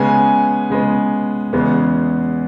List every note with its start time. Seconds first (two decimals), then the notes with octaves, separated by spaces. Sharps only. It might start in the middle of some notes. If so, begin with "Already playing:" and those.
Already playing: C#3 G#3 B3 G#5
0.70 C#3 G#3 B3
1.53 E2 C#3 G#3 B3